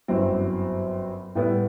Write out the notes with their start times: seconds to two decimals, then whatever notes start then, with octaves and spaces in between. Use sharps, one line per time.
0.08 G1 F#2 F#3 C4 E4
1.35 A2 G3 B3 E4